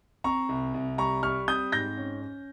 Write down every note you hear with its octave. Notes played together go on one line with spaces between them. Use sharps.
C4 A#5 C#6
C2
C2
G3 A#5 C#6
G3 C#6 F6
C4 D#6 G6
G#2 G6 A#6
C#4
C#4